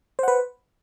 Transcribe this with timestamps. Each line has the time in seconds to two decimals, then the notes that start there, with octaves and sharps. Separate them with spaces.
0.19 C5
0.23 F#5
0.28 B4